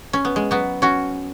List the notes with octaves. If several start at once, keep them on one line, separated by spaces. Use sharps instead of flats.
C#4
B3
G#3
F#3 B3
C#4 F#4